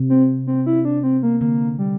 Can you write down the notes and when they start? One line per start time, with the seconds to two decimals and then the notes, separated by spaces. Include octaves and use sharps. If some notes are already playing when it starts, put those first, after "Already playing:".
Already playing: C3
0.10 C4
0.47 C4
0.66 E4
0.85 D4
1.03 C4
1.23 A#3
1.41 D3 A#3
1.79 G3